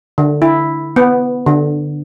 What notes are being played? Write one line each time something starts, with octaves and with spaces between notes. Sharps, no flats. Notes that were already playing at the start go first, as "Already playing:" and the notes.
D3
E4
B3
D3